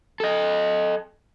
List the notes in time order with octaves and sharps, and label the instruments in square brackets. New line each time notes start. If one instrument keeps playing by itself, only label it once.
[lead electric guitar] A4 D#5